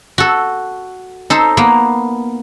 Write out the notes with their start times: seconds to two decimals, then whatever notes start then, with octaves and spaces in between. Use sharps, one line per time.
0.18 F#4 A4
1.30 D#4 A4 C5
1.57 A#3 B3